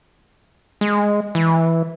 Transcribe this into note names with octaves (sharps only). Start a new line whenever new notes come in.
G#3
E3